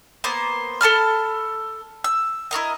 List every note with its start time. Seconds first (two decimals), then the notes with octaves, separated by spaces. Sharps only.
0.24 A#3 B3 C5
0.81 A4 A5 B5 F6
2.04 E6
2.51 E4 F#4 A#4 D#5